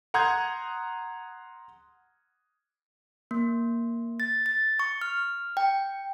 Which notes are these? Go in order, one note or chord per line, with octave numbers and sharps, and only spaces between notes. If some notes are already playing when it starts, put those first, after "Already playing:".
F#5 A#5 C6 D#6 G6 G#6
A#3
A6
A6
C#6
F6
G5